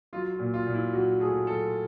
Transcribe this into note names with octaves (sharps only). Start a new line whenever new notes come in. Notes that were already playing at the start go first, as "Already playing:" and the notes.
F#3 F4
F4
A#2
F4
A#2
E4
F#3 F#4
A3 G#4
F#3 A4